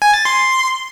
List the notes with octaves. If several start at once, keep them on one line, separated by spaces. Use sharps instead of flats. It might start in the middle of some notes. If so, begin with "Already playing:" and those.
G#5
A6
C6